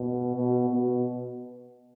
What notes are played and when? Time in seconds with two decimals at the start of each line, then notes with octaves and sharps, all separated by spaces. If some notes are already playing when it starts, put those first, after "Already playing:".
Already playing: B2
0.35 B2
0.70 B2